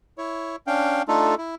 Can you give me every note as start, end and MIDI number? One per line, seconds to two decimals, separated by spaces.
0.18 0.56 64
0.18 0.56 73
0.67 1.02 61
0.67 1.02 62
0.67 1.02 77
0.67 1.02 79
1.08 1.35 57
1.08 1.35 62
1.08 1.35 63
1.08 1.35 65
1.08 1.35 69
1.38 1.55 64